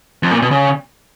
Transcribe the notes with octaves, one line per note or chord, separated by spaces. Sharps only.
F2
A#2
B2
C#3